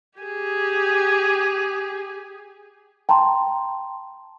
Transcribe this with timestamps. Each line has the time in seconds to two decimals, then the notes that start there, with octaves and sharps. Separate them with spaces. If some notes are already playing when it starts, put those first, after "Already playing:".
0.19 G4 G#4
3.09 G5 A5 A#5 C6